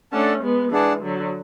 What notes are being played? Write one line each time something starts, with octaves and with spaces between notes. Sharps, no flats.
A3 C#4 D4 A4 D5 F#5 A5
G#3 B3
E3 G#3 D4 G#4 D5 F#5 A5
D3 F#3